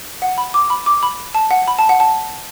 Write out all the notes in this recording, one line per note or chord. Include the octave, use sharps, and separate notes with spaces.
F#5
B5
D6
B5
D6
B5
A5
F#5
B5
A5
F#5
A5